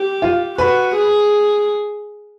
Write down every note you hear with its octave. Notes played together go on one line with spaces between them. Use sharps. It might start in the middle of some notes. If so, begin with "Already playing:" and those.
Already playing: G4
F4
F#4 B4
G#4